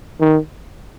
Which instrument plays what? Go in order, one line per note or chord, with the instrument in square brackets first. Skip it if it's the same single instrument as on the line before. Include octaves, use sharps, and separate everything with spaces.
[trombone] D#3